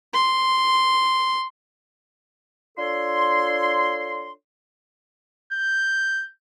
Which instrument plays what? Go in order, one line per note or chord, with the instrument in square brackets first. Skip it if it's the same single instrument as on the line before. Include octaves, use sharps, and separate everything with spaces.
[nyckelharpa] C6
[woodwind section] D4 F4 A4 C#5 C6
[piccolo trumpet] G6